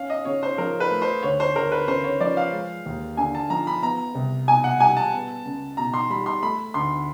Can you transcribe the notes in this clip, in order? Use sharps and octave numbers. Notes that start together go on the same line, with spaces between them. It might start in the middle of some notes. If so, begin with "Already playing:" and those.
Already playing: C#4 F5
D#5
C#3 C#5
C5
F3 A#4
B4
A3
C5
D2 C#5
C5
D2 A#4
B4
C#3 C5
C#5
F3 D5
F5
G#3
D#2
D3 G#5
A5
F3 A#5
B5
B3 A#5
C2
B2 G#5
F#5
G3 G#5
A5
B3
C#2
B2 A#5
C6
G3 B5
C6
A3 B5
D2 C6